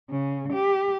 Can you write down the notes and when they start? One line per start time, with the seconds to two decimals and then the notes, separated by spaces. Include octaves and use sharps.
0.10 C#3
0.53 G4